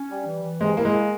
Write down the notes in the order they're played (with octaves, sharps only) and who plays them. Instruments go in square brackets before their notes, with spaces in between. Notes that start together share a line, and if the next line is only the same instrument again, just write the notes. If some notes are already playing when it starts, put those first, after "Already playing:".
Already playing: [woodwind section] C#4
G3
E3
E3
[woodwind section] C3 [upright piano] G#3
[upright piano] A#3 [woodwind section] E4
[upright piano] G#3
[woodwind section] A#3